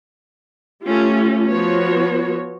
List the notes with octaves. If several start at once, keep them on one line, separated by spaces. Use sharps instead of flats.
A3 C#4 F4 G4
F3 B3 F#4 C#5